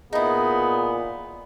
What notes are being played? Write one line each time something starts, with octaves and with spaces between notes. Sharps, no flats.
A#2 B3 D#4 E4 G#4